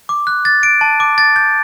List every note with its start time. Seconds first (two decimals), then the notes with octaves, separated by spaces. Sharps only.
0.09 D6
0.27 F#6
0.45 A6
0.63 D7
0.81 A5
1.00 D6
1.18 A6
1.36 G6